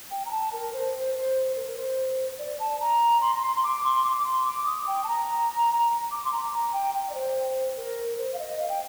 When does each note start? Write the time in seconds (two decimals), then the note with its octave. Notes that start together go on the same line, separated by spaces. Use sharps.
0.11 G5
0.25 A#5
0.31 A5
0.52 A#4
0.73 C5
0.94 C5
1.14 C5
1.56 A#4
1.67 A#4
1.76 C5
2.38 D5
2.60 A5
2.80 A#5
3.21 C6
3.34 A#5
3.42 C6
3.56 C6
3.63 D6
3.84 C6
4.04 D6
4.24 C6
4.45 D6
4.66 D#6
4.87 G5
5.04 A5
5.08 A#5
6.11 D6
6.25 C6
6.32 A#5
6.52 A#5
6.73 G5
6.94 G5
7.10 D5
7.14 C5
7.77 A#4
8.18 C5
8.33 F5
8.39 D#5
8.60 F5
8.69 G5